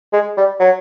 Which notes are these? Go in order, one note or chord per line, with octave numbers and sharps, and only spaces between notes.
G#3
G3
F#3